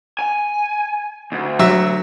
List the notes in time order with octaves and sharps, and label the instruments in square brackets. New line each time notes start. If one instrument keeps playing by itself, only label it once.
[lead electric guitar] G#5
D2
[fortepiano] F#3 E5 E6